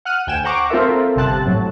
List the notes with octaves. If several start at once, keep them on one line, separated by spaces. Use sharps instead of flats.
F#5 F6 F#6 D#7
D2 G5 G#5 E7
C5 F#5 A#5 C#6 D6
C4 F4 A4 A#4 E5
G1 C3 C4 A5 F#6
A2 F#3